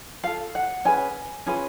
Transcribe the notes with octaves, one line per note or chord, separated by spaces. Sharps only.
F4 A4 F5
F#5
C#4 G#4 B4 G#5
C#4 F4 G#4 B4